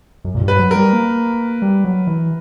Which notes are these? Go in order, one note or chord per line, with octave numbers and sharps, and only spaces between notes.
F#2
A#2
G2
B4
F#3
G3 A#4
A#3
G3
F#3
E3